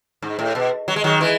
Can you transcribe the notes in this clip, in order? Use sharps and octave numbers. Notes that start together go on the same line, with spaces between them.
G#2
A2
B2
F#3
G#3
D#3 F#3
E3 G#3